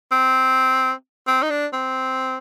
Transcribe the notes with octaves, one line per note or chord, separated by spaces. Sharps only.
C4
C4
D#4
D4
C4